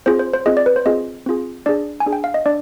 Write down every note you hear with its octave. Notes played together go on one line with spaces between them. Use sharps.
C4 F4 G#4 C5
C5
C5
C4 F4 G#4 D#5
D5
B4
C5
C4 F4 G#4 D#5
C4 F4 G#4
D4 G#4 D5
G#5
D4 G#4
G5
F5
D#5
D4 D5